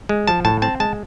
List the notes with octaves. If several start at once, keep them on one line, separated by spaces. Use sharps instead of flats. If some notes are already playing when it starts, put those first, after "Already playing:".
G#3
F3 A5
A2 A5
C4 A5
G#3 A5